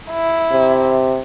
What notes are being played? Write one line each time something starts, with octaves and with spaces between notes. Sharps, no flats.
E4
C3